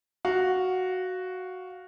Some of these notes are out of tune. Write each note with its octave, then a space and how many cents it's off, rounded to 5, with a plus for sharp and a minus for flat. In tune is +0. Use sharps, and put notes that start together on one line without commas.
F#4 +0 F5 +10